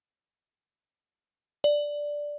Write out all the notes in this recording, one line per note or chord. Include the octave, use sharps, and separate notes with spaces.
D5